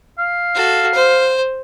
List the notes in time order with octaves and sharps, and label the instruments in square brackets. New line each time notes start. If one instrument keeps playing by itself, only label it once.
[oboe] F5
[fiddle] F#4 A4
C5